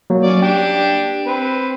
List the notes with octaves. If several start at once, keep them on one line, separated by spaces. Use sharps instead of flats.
F#3 A#3
C#4 D5
D4 G4 G5
C4 B4